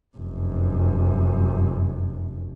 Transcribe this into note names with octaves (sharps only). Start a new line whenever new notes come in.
F1 F#2